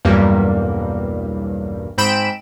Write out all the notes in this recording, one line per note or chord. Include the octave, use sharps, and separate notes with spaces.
B1 E2 G2 F#3 G3 A#3
G#2 C4 G5 B5 D7 E7